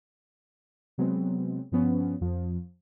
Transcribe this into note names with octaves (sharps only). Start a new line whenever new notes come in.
C3 F#3 G#3 B3 C4
G2 F3 B3 C#4
F2 F3